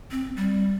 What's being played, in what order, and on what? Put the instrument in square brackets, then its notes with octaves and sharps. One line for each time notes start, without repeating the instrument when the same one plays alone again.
[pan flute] C4
G3